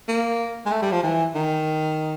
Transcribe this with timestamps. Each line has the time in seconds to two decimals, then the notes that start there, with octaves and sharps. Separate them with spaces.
0.08 A#3
0.66 G#3
0.71 A3
0.82 G3
0.92 F3
1.03 E3
1.35 D#3